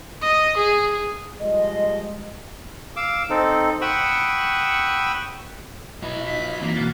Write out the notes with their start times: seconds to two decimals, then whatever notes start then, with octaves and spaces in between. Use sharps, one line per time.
0.22 D#5
0.57 G#4
1.40 F3 G3 G#3 D#5
2.96 F5 D6 E6
3.30 C4 D#4 A4
3.81 F#5 G5 B5 C#6 D#6 E6
6.03 F#3 E4 B4 D#5
6.27 D#4 F4 B6
6.62 E3 F#3 A#3 C4
6.76 B2 E3 F#4 F5 F#5 A6